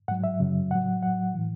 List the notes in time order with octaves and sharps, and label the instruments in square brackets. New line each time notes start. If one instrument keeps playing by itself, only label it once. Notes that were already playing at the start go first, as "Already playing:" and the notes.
[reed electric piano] G#2 F#3 F#5
E5
F#2 C#3 F#3
A2 F#3 F#5
A2 F#3 F#5
A2 E3